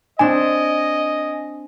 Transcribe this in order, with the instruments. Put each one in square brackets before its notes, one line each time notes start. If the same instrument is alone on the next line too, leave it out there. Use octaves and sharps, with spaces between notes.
[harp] C4 D4 E7 [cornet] D#5 [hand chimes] G#5